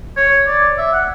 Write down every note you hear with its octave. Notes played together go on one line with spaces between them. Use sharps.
C#5
D5
E5
F#5